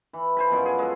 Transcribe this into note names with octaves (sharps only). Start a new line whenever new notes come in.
E3
C5 G#5 B5
F#2 B2 F3
G#4
G#3 G#4 A4